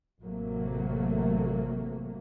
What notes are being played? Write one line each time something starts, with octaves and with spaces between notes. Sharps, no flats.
A1 C3 F#3 A3 A#3